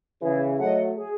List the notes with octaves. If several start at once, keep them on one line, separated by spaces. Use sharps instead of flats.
C#3 E3 G#4
F#3 A3 D#5 F#5
G#4